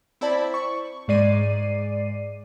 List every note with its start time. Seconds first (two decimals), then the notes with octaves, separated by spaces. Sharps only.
0.21 C4 E4 C5 D5 A5 B5
0.54 C#6
1.08 G#2 G#3 D5 C7 D#7